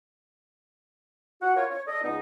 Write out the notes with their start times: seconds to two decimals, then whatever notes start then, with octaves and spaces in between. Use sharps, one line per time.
1.42 F#4 F#5
1.56 F4 A#4 C#5
1.70 C#5
1.86 A4 D5 D#5
2.03 C#2 B3 D#4